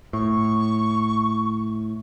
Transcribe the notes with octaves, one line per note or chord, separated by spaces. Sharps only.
A2 C#6